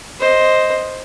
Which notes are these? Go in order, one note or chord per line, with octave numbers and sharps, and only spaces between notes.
C5 D#5